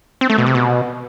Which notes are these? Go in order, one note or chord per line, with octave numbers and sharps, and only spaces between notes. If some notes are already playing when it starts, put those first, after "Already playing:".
C4
A3
B2
C3
B2